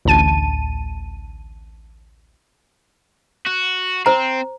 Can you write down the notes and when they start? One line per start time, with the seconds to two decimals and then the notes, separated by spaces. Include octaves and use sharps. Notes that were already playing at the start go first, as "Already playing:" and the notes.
0.05 A1 D2 A5 D#7
3.46 F#4
4.06 C4 C5 A#5